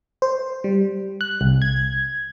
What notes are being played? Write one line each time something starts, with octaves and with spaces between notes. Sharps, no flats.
C5
G3
F#6
C2
G#6